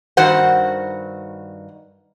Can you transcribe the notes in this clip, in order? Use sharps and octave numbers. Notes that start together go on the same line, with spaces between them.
G2 D#3 F#4 C5 F#5